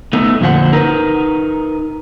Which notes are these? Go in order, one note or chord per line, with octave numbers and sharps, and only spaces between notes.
A3 B3 D#4
F2 A#2 D3 E4 C5 F#5
D#4 A#4 B4